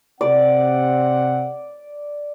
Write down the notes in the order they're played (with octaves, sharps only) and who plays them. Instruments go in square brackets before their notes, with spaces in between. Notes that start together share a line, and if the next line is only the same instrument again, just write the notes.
[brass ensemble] C3 C4 F#5 [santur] D5